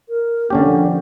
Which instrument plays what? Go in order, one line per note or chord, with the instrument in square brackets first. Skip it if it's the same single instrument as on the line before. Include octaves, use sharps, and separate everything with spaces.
[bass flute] A#4
[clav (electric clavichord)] D3 C#4 G4 [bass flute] A#3
[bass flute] F3